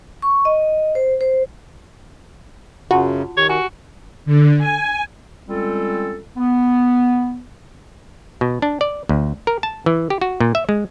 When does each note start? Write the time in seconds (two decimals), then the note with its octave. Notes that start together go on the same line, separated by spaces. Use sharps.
0.22 C#6
0.45 D#5
0.95 C5
1.21 C5
2.91 F#2 C#3 F4 F#4 A5 C6
3.37 D#3 G4 C#5
3.49 F#4 G#5
4.26 D3
4.58 G#5
5.49 G3 G#3 C4 C#4 F4 A4
6.37 B3
8.41 B2
8.62 D4
8.81 D5
9.09 D2
9.47 A#4
9.63 A5
9.86 E3
10.10 G4
10.21 F#4
10.40 A#2
10.55 E5
10.69 G#3